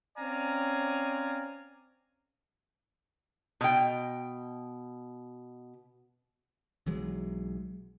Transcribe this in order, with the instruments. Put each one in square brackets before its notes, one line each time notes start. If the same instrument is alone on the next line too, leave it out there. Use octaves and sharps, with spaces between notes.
[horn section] C4 C#4 D5 F5 G#5 A#5
[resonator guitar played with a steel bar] B2 G5
[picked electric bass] B1 E3 F#3 G#3